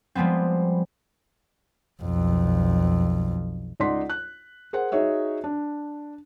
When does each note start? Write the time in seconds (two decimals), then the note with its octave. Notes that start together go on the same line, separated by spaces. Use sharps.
0.15 F3 G3 G#3 B3 C4
2.02 B1 F2
3.80 C#2 D#4 D5 F#5 C6 B6
4.10 F#6
4.73 G#4 A#4 C5 F#5
4.92 D#4 F#4 G#4 C#5 E5
5.44 D4